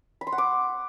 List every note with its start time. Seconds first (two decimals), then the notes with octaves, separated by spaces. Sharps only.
0.21 B5
0.27 C6
0.32 F#5
0.38 D6